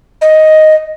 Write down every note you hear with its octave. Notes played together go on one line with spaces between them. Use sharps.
D#5